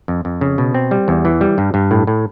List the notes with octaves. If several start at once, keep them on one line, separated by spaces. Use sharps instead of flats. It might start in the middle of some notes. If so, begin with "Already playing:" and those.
F2
F2
C#3
B2
C4
G3
E2
E3
G3
G2
G2
A2
A2